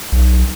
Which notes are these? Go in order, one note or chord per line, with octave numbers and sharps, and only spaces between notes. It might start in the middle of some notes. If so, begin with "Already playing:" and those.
B1